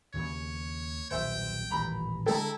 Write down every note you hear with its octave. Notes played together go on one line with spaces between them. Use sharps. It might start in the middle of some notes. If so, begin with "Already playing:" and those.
D#2 C#3 A#3 C#5
D#1 B1 C5 E5 G5
D#1 A1 A#2 A#5 B5
D3 G#3 E4 A4 G5 A#5